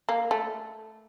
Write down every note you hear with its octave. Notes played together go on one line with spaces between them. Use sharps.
A#3
A3